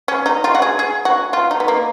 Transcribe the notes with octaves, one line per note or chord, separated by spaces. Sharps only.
C#4
D#4
F4
F#4
G#4
G#4
F#4
F4
D#4
B3
A#3